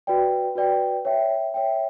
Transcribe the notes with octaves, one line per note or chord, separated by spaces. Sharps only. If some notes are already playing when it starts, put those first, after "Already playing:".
F#4 B4 D5 G5
F#4 B4 D5 G5
C#5 E5 G5
C#5 E5 G5